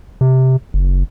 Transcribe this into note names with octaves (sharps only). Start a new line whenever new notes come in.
C3
F#1